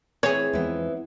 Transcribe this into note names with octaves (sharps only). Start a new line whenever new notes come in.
E3 C4 G#4 C#5
E2 E3 F3 G#3 B3